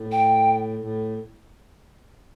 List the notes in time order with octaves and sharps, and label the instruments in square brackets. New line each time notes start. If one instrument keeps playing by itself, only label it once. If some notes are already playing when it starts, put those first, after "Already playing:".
Already playing: [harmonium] A2
[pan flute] G5
[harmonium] A2